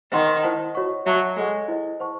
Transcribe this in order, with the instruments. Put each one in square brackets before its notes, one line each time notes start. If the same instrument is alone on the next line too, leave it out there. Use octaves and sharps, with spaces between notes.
[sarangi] D#3 [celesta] C5 F#5 C6
[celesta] E4 C5 F#5 A5
F#4 C#5 F#5 C#6
[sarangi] F#3 [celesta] C#5 E5 A5 C#6
[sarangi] G#3 [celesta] A4 C#5 F#5 C#6
[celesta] E4 C5 D#5
C5 F#5 A5 C#6